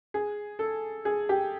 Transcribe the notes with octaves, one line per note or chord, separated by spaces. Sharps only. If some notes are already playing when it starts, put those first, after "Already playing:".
G#4
A4
G#4
G4